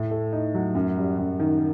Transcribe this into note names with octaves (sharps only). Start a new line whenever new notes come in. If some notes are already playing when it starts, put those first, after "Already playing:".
Already playing: A2
A3
D#4
F#3
F#2
G3
F#2
D#3